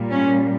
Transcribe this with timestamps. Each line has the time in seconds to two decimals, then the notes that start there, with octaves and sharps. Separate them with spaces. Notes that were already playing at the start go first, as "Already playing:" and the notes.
Already playing: A#2 G3
0.11 C#4